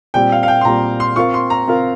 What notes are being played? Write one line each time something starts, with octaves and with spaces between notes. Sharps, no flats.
A#2 G3 C4 G4 G5
F5
F5
G5
C6
A#2 G3 C4 G4 A#5
C6
C4 F4 A#4 F5 C#6
C6
A#5
C4 F4 A#4 F5